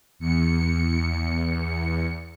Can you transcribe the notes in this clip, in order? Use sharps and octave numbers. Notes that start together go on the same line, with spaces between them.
E2 C#7